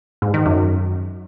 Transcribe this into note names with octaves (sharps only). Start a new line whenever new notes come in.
G#2
D#3
F#2